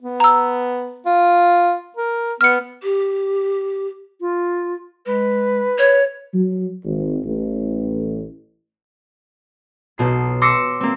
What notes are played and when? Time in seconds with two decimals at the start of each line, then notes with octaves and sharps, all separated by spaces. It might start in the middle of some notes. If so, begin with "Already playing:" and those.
0.02 B3
0.20 A#5 E6
1.06 F4
1.97 A#4
2.41 B3 F6 C#7
2.83 G4
4.21 F4
5.06 G#3 B4
5.78 C#5
6.34 F#3
6.84 G#1
7.23 A1
9.98 B1 B2 C7
10.41 C6 D6 E6 A#6 C7 C#7
10.80 A#3 C4